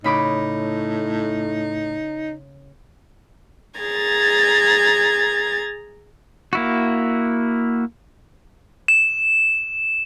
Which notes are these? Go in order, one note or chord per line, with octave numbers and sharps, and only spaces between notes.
A2 C#3 D#4 B5 D6
G#4 A#5 G#6 A6
A#3 E4 F#4
E7